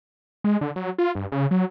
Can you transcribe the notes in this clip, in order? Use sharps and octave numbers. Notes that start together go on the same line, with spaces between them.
G#3
D3
F#3
F4
G2
C#3
F#3